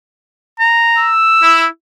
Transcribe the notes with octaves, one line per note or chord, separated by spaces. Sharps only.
A#5
E6
E4